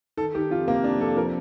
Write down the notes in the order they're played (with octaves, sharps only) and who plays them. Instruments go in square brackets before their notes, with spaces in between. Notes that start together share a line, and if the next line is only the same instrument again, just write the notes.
[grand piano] D#3 A4
D#3 G4
F2 F4
C3 A#3
F2 D4
F2 A4
F3 A#4